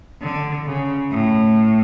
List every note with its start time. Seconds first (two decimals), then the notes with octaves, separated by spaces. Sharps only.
0.22 D3
0.66 C#3
1.11 A2